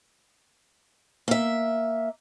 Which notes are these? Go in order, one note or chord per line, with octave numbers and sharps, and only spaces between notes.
A#3 E5